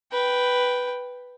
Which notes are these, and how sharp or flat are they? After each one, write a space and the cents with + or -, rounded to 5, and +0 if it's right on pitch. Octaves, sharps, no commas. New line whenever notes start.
B4 +0 G5 -5